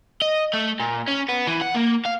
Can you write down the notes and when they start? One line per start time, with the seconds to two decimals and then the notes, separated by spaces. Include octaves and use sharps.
0.22 D#5
0.53 A3
0.80 A#2
1.08 C#4
1.29 B3
1.47 E3
1.61 F#5
1.75 A#3
2.05 F5